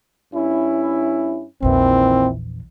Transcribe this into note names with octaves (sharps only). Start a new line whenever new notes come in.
G2 C#4 E4
A#1 E2 A#2 D#3 E3 C4